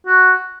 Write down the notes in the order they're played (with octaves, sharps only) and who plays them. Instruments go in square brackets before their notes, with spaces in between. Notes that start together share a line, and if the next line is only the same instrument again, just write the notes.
[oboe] F#4